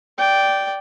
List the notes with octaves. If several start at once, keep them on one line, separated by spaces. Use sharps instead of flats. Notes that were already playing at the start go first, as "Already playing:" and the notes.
D5 G5